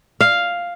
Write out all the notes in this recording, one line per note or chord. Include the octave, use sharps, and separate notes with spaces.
F5